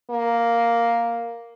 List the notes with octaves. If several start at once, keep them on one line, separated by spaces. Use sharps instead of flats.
A#3